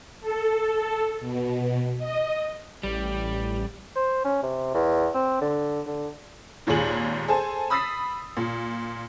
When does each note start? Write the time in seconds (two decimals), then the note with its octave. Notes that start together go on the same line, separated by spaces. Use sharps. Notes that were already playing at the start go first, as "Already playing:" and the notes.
0.21 A4
1.20 B2
1.98 D#5
2.83 A1 G3
3.96 C5
4.25 C#4
4.43 C3
4.74 E2
5.14 C4
5.41 D3
5.86 D3
6.67 G#1 D#2 A#2 G#4 F#7
7.28 G#4 A4 C5 G#5 A5
7.70 B5 D#6 E6 A6 B6 C7
8.37 A#2